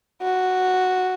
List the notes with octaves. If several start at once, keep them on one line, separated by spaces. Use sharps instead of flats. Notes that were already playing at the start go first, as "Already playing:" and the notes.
F#4